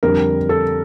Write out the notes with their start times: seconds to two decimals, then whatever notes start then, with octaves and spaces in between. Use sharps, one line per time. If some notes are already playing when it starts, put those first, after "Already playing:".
0.03 F2 D3 G3 A#4
0.49 A4